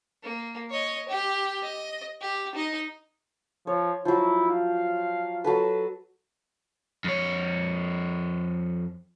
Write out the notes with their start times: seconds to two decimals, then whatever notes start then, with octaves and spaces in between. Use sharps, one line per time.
0.23 A#3
0.70 C#5 D#5
1.09 G4
1.62 D#5
2.21 G4
2.55 D#4 D#5
3.67 F3 C#5
4.05 F3 F#3 E4
4.50 F5
5.44 F#3 A4 B4
7.04 F2 C#5